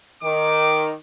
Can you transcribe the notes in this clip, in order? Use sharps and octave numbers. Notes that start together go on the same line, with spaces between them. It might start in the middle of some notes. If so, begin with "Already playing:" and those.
D#3 D6